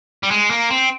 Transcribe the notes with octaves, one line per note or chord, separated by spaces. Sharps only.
G3
G#3
A#3
C4